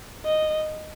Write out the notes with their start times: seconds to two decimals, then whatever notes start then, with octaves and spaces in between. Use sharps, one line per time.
0.25 D#5